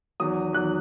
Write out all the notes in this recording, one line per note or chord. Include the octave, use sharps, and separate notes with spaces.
E2 D#3 F#3 D#6
E2 D#3 F#3 F#6